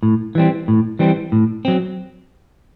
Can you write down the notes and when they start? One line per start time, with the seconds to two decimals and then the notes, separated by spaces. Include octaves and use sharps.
0.03 A2
0.35 E3 G3 C4
0.68 A2
0.99 E3 G3 C4
1.32 A2
1.65 F#3 C4